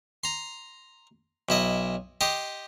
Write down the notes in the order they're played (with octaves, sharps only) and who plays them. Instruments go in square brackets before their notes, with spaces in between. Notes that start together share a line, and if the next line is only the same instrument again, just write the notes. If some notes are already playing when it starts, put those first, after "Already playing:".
[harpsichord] A#5 C6
B1 E4 D#5
G4 D#5 C6